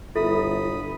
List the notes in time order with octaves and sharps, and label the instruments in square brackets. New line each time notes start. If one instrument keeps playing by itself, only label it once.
[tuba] G1 [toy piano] E4 A4 E5 [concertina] B5 D#6